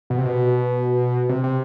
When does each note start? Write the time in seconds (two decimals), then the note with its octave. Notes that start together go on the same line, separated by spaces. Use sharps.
0.10 B2
0.18 C3
0.26 B2
1.29 C3
1.44 C3